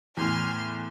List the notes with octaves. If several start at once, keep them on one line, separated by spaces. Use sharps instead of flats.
E2 A2 G#5 C6 F6